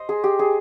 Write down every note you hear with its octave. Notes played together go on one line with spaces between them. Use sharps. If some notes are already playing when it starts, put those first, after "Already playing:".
Already playing: C5 D#5
G#4
G4
G#4